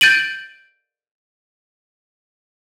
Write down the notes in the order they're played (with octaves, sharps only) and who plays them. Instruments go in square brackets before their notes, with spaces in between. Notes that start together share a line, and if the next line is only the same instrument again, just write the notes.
[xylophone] G6 A6 D7 D#7 F#7